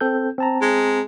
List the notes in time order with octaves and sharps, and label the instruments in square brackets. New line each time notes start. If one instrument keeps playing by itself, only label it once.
[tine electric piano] C4 A4 G6
C4 A5 A#5
[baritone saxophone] G#3